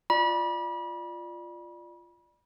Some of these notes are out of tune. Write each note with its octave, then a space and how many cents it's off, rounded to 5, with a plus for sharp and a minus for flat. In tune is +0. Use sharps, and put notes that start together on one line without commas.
F4 -5 D5 +20 B5 -35